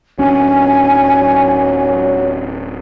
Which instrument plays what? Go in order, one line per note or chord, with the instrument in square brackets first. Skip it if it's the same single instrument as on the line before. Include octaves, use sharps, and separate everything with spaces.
[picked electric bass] D1 C#4 D4 [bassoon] F#3 [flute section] G#5